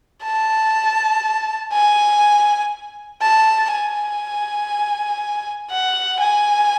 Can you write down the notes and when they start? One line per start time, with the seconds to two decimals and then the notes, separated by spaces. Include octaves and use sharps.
0.23 A5
1.72 G#5
3.21 A5
3.72 G#5
5.70 F#5
6.20 G#5